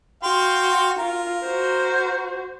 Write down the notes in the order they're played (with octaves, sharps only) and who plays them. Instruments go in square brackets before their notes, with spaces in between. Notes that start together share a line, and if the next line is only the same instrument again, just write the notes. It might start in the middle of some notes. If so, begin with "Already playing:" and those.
[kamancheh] F#4 [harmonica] F5 G5 C6
[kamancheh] F4 [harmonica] A#4
[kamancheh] F#4 C5